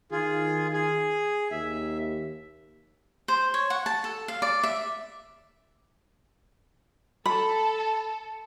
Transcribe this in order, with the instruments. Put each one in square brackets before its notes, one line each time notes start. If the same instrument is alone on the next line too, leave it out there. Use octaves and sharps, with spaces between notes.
[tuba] D#3 [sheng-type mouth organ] F4 G#4
[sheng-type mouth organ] G#4
[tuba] D#2 [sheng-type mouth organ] E5
[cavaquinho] C5
C#5
F#5
A5
A4
F5
D5
E5
[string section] A4 [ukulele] B5